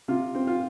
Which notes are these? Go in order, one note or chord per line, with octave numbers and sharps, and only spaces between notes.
C3 F4
C4
F4